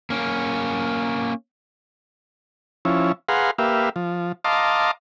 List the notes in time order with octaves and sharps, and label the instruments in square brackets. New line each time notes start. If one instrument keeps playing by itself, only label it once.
[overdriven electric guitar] A#3 C#4
[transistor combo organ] F3 C#4 E4
G#4 B4 F5 F#5 A#5 C6
A#3 G4 B4 E5 F5
F3
D#5 F5 A5 A#5 C6 D6